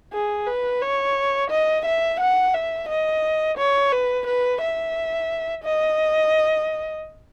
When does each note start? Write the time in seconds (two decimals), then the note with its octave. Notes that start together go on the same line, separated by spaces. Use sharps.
0.13 G#4
0.47 B4
0.82 C#5
1.50 D#5
1.86 E5
2.20 F#5
2.54 E5
2.89 D#5
3.58 C#5
3.92 B4
4.27 B4
4.61 E5
5.64 D#5